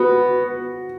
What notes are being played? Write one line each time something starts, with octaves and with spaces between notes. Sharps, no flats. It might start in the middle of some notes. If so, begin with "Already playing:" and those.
Already playing: B3 F#4